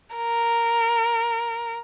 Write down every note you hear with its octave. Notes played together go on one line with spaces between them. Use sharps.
A#4